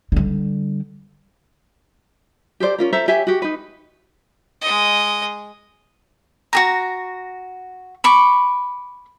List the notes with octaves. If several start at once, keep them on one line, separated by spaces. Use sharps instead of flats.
D3 G3
G4 A4 C5 D5
C#4 F4 A#4
A4 C5 E5 A#5
G4 C#5 E5 G#5
F#4 G4
D#4 B4
G#3 D#5
F#4 G#4 A#5
B5 C#6 D6